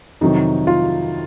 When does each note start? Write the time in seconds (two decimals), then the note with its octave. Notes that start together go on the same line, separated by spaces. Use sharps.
0.21 F2 C3 D#3 F#3 D#4
0.67 F4